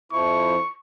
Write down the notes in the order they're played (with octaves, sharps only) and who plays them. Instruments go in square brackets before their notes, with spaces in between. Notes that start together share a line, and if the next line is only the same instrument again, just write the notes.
[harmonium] F2 F3 E4 [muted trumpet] C#6